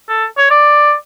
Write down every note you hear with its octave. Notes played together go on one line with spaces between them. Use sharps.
A4
C#5
D5